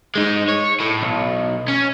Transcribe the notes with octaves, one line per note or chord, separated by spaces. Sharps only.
G#3 D#4
C#5
A2
B1
C#4